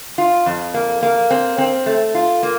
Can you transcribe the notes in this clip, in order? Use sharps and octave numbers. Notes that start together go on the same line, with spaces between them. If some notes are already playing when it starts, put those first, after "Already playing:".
F4
F2
A#3
A#3
C4
C4
A3
F4
A#3